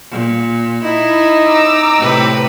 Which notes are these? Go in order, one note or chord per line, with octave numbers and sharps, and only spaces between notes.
A#2
D#4 E4
A#5 D6 E6
A2 C3 B4